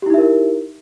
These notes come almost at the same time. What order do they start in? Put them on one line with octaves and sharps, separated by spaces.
G4 E4 D#4 E5 A#4